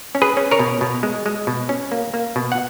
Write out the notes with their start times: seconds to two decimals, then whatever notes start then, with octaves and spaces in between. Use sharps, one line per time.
0.15 C#4
0.22 G#4 B4
0.37 C#4
0.51 A#4 C#5
0.59 B2
0.81 B2
1.03 G#3
1.26 G#3
1.47 B2
1.69 C#4
1.92 A#3
2.14 A#3
2.36 B2
2.52 F#5